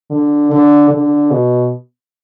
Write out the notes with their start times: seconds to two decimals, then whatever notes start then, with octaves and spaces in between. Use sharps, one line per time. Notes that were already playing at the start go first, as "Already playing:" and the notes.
0.11 D3
0.51 D3
0.91 D3
1.31 B2